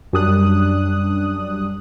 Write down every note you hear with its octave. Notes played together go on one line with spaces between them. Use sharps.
F#2 G3 D4 D#6 F#6